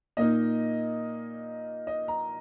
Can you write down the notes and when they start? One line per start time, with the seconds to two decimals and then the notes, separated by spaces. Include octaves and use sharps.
0.17 A#2 A#3 D#4 D#5
1.87 D#5
2.08 A#5